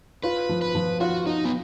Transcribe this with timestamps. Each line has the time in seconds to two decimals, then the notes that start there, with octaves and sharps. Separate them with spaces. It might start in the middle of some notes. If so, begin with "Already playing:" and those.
0.24 F4 B4
0.49 F3
0.62 B4
0.75 F3
1.00 F4 F#4
1.26 D#4 F4
1.45 B3